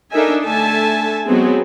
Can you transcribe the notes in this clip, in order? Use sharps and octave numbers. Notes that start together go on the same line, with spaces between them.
D4 D#4 A4 A#4 E5 G#5
D3 A3 A4 E5 G#5 A5
F#3 G#3 B3 C4 D#4 G#4